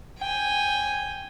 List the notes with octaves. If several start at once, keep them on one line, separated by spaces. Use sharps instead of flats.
G5 G#5